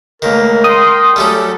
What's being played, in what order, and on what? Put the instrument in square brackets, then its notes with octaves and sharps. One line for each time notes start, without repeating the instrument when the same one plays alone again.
[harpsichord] C#2 D#3 [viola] A3 A#3 [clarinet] A#4
[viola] G5 C6 [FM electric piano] D#6
[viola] F#3 A4 [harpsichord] G3 A3 C#4 [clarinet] G4